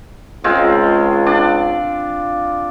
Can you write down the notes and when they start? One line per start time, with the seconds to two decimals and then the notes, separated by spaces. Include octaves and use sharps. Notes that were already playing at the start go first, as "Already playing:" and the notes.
0.44 C#2 G#3 C4 F4
1.26 D4 D5